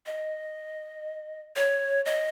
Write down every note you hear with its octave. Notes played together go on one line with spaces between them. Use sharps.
D#5
C#5
D#5